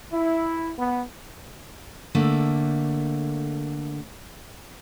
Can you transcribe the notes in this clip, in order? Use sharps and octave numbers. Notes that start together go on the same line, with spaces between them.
E4
B3
D3 A3 A#3